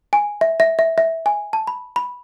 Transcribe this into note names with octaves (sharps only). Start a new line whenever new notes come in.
G#5
E5
E5
E5
E5
G#5
A5
B5
B5